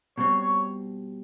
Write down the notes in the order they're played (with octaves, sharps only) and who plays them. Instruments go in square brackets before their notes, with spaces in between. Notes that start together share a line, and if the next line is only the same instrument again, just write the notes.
[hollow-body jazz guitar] B2 G3 C4 [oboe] C#5
[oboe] C#5